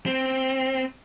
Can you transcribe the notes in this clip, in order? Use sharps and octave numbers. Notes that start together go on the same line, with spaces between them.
C4